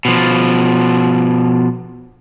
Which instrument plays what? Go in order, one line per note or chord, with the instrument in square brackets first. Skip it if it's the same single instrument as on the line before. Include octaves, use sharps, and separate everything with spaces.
[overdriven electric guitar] B2 F3